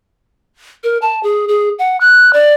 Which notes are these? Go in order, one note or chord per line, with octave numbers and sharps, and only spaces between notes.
A#4
A5
G#4
G#4
F#5
F#6
D5